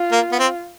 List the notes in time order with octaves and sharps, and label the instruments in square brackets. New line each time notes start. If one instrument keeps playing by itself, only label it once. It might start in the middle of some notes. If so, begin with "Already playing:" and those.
Already playing: [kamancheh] F4
[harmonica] A#3
B3
C4